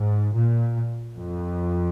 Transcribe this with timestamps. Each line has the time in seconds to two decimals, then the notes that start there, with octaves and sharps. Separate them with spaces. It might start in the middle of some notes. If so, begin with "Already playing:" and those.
Already playing: G#2
0.35 A#2
1.17 F2